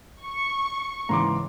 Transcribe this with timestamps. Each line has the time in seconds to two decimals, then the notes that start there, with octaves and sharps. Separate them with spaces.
0.23 C#6
1.09 G#2 C#3 E3 A#5 C6 D6